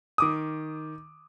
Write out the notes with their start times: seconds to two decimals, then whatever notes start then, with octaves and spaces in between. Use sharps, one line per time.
0.18 D#3 D6 D#6